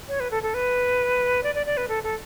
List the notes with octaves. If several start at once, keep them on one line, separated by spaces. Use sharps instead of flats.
C#5
B4
A4
A4
B4
D5
D5
D5
B4
A4
A4